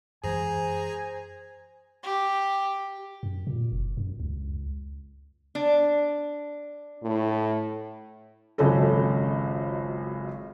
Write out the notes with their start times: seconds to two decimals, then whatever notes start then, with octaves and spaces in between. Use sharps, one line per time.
0.24 F#2 E3 G#3 G#4 C5 G#5 A#5
2.04 G4
3.23 F#2
3.47 A#2
3.72 F1
3.97 F#2
4.20 C#2
5.55 D4
7.03 A2
8.58 G#1 C#2 F#2 C#4 A4